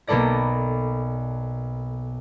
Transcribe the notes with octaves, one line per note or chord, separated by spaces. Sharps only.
B1 A#3 B3 A4 D5 A#6